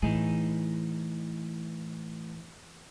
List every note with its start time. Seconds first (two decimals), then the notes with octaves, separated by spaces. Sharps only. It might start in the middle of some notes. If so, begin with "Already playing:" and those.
0.02 A2 E3 D#4 G#4